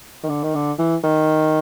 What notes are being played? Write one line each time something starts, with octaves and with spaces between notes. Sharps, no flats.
D#3
D3
D#3
D3
E3
D#3